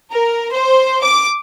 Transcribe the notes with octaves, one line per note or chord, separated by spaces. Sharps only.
A#4
C5
D6